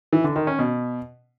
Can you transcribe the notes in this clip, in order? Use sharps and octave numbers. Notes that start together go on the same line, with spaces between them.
E3
D3
D#3
C#4
B2